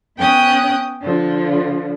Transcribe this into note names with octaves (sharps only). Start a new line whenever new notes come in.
B3 C#4 G5 D#6 F#6
D3 F3